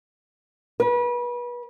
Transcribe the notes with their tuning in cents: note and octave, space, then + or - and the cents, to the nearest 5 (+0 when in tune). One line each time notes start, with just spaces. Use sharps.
B4 -30